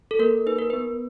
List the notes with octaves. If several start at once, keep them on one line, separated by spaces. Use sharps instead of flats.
A4
A#3 A#4
D#4 B4
A#4
B3 B4